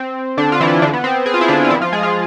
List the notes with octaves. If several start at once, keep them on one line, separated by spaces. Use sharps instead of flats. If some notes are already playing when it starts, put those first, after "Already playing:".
Already playing: C4
D3 D4
F4
E3 E4
D3 D4
B3
C4
G#4
F4
E4
D3 D4
F4
E3 E4
F3 F4
G#3 G#4
F3 F4